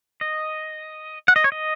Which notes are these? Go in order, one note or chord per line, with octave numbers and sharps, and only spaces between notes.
D#5
F#5
D#5
C#5
D#5